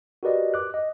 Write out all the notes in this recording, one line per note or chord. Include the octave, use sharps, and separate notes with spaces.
F#4 G4 A#4 B4 D5 D#5
D6 F#6
D#5